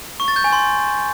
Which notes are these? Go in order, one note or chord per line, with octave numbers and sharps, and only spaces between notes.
C#6
A6
G6
G#5
C6